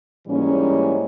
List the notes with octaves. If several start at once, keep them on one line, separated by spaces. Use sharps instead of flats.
G#2 E3 G3 A#3 C#4